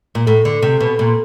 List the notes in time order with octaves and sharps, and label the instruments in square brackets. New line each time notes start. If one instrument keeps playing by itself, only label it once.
[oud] A#2
[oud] A2 [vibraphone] A4
[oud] D3
C3
B2
A#2